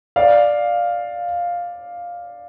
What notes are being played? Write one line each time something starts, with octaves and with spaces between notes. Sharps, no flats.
D5 F5